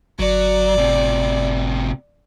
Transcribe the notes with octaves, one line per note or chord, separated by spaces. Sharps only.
G1 F#3 D5
A2 C3